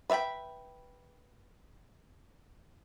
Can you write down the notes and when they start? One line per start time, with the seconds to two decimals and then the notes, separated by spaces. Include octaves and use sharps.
0.10 B4 E5 F5 G5 B5